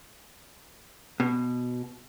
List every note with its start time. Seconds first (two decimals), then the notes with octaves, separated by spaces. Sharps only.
1.20 B2